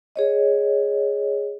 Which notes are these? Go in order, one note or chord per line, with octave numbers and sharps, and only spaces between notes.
G#4 C#5 D#5